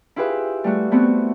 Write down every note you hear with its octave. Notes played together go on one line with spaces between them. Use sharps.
E4 F4 G4 G#4 B4 E5
G3 A3 F#4
A3 B3 C4 E4 F#4